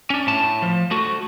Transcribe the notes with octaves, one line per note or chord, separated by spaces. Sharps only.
C#4 D4
A2 A5
F3
A3 F#4